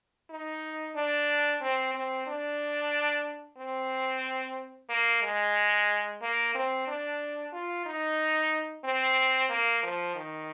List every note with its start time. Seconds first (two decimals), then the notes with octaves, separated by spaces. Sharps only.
0.30 D#4
0.95 D4
1.61 C4
1.94 C4
2.27 D4
3.58 C4
4.89 A#3
5.23 G#3
6.22 A#3
6.55 C4
6.87 D4
7.53 F4
7.86 D#4
8.84 C4
9.50 A#3
9.83 F3
10.15 D#3